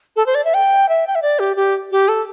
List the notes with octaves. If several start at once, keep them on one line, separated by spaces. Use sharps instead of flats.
A4
C5
D5
E5
G5
E5
G5
E5
D5
G4
G4
G4
A4